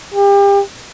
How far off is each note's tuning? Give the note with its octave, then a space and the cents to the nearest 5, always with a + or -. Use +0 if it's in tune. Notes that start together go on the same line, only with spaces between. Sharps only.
G4 +30